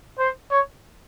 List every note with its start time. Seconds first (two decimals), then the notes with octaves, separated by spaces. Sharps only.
0.19 C5
0.50 C#5